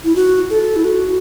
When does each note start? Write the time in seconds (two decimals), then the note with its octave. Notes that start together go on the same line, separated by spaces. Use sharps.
0.04 E4
0.16 F#4
0.50 A4
0.76 E4
0.84 F#4